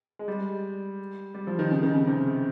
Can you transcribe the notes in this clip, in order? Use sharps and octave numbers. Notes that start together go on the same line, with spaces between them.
G#3
G3
G3
F3
D#3
C#3
D#3
C#3
C3